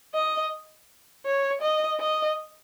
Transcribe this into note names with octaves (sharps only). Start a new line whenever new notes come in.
D#5
C#5
D#5
D#5